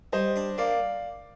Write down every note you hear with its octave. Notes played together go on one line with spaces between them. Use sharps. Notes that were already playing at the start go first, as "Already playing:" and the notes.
G3 C5 D#5
D4
A#3 D5 F5